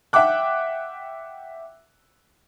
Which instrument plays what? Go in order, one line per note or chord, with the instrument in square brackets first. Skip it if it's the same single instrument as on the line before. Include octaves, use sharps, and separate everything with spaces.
[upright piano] E5 F#5 G5 D6 F#6